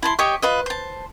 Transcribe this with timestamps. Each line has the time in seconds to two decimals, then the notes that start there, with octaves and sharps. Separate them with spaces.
0.02 E4 A5 C6
0.19 G4 C#5 D#5 C#6
0.42 F4 B4 D#5
0.66 C5 A5